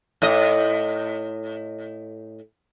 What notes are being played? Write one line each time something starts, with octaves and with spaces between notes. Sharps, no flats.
A2 D#5